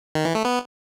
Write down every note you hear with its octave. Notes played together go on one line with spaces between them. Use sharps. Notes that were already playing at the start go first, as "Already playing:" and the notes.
D#3
E3
A3
B3